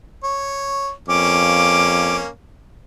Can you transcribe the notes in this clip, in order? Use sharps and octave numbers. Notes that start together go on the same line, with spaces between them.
C#5
F2 A#3 C#4 D6